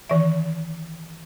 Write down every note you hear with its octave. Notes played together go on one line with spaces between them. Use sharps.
D#3 E3 E5